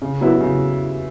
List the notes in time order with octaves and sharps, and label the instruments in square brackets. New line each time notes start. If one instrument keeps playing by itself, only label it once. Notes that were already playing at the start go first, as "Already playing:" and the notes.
[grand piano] C#3
F#3 B3 E4
C#3